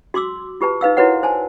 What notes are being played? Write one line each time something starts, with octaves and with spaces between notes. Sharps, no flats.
F#4 C6 D6 E6
F4 G4 B4 A5
D#4 B4 F5 E6
E4 F#4 A#4 B4 C#5 F#5
C5 G#5 A5